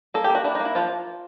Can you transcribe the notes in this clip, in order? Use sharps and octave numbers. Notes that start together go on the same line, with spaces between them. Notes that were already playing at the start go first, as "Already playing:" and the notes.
A#3 A4
G4
A#3
F#4
D4 E4
D#4
A#3
E4
F3 F4